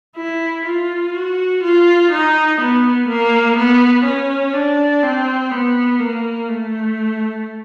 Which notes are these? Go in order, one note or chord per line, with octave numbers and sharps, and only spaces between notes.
E4
F4
F#4
F4
D#4
B3
A#3
B3
C#4
D4
C4
B3
A#3
A3